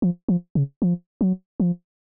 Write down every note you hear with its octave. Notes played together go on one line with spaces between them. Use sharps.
F3
F3
C#3
F3
F#3
F3